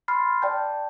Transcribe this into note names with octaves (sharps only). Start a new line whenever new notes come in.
B5 C6 F6 A6 C7
D5 G5 A5 G6